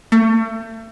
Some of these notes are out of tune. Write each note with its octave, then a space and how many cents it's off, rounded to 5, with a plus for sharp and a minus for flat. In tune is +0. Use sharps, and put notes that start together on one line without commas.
A3 +35